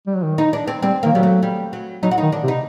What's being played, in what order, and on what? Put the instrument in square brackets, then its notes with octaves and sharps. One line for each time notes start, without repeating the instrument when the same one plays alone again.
[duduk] G3
F#3
D#3
[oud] D#4
D4
C4
[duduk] G3 [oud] C4
[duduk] D#3 [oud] A#3
[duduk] F#3 [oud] G3
[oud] A3
G3
F#3
[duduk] F#3 [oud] D#4
[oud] F#4
[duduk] D#3 [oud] D#4
[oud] D4
[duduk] C3
[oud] D#4